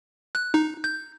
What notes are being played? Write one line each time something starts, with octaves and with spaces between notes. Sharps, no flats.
F#6
D#4
G6